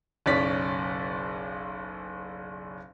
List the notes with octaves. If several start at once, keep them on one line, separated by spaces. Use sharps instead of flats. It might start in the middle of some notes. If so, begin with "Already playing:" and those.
F#1 B1 C#4 D5 B6